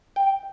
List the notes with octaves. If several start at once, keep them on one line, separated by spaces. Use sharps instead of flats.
G5